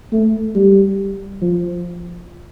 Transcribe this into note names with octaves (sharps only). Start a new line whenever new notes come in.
A3
G3
F3